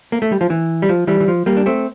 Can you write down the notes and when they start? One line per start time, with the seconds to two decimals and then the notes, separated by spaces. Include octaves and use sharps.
0.12 A#3
0.22 A3
0.32 G3
0.41 F3
0.50 E3
0.82 G3
0.89 F3
1.07 E3 G3
1.20 E3
1.28 F3
1.46 G3 A#3
1.57 D4
1.66 A3 C4